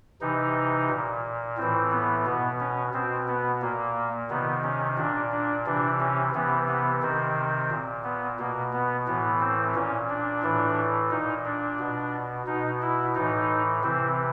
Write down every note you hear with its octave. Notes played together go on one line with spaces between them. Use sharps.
C3 E3 D#4
A#2
A2 E3 C4
B3
B2 B3
C#4
B2 C4
B3
A#2 A#3
C3 D#3 B3
C#4
A#2 D4
D4
C3 E3 D4
C#4
C3 E3 B3
B3
C3 D#3 C4
A#2
B3
B2 A#3
B3
A2 E3 B3
C4
A#2 C#4
D4
A2 E3
A#2 D#4
D4
B2
B2 D#4
E4
A2 E3 D#4
C3 E3 C4